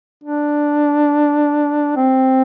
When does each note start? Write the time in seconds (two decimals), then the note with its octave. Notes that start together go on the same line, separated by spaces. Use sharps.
0.24 D4
1.96 C4